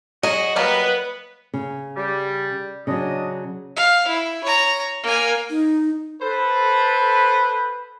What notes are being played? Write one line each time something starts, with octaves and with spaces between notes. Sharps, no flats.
F#3 F#4 G#4 D#5
F#3 G3 A#3 B3 B4
C#3
G3
C#3 F#3 D4 D#5
F5
E4
C#5 A#5
A#3 G#5
D#4
A4 B4 C5